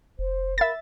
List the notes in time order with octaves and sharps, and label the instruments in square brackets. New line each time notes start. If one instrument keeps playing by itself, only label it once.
[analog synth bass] F1 [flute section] C5
[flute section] A#4 F5 B5 [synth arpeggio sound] E5 A6